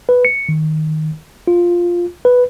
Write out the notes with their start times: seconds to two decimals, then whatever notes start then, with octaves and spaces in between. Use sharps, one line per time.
0.09 B4
0.25 C#7
0.49 D#3
1.48 F4
2.25 B4